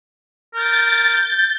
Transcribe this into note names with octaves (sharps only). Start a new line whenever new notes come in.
A#4 G6 A6